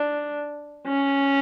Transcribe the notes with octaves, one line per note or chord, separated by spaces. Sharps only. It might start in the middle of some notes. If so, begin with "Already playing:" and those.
Already playing: D4
C#4